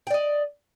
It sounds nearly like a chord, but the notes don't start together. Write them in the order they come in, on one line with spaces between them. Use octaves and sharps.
G5 D5 D#5